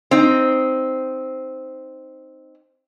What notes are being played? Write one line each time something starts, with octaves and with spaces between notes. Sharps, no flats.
C4 D#4